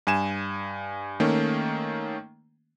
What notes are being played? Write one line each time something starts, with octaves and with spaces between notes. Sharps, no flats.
G2 G#5 E7
D#3 A3 A#3 C#4